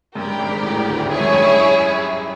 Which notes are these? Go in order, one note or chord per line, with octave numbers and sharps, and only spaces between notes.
F#2 G4 A#4 D5 G5
G2
G#1 G#2
G#1 G#2
A1 A2
G#1 G#2
D2 D3
E2 E3
F2 F3 E4 G#4 C#5
F#2 F#3
G2 G3
G#3